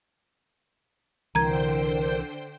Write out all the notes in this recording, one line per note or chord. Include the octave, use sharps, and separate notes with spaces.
C2 D3 E3 A#4 C5 G5 A#5 G#6